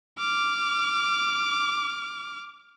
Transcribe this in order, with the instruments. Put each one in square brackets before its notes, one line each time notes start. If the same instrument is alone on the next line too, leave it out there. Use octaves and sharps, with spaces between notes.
[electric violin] D6 F6